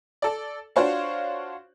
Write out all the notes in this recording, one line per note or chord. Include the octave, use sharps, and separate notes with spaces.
A4 D5
D4 F4 F#4 C5 C#5 F5